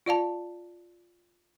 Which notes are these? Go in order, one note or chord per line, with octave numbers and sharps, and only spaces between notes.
F4 D5 F5 A5